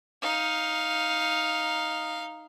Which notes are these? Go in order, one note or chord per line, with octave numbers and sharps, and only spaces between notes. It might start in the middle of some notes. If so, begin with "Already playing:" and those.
D#4 F5